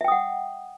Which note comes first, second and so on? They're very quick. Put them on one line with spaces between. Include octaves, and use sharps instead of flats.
E5 G5 D#6 F#5